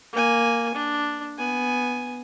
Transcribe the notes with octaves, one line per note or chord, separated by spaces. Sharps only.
A#3 G#5
D4
B3 G#5